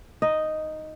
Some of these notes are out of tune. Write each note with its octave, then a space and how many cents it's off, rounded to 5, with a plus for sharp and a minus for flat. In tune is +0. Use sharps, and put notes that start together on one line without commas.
D#4 +0 D#5 +0